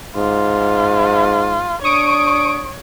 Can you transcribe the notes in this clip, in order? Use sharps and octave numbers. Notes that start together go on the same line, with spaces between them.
G#2 F4
D4 C#5 C#6 D#6 D7